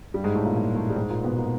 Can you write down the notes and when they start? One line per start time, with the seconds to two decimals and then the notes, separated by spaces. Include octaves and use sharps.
0.14 G2 G3
0.24 G#2 G#3
0.35 A2 A3
0.45 A#2 A#3
0.55 A#2 A#3
0.76 A2 A3
0.90 G3
0.96 G#2 G#3
1.10 A#2 A#3
1.24 B2 B3
1.37 A#2 A#3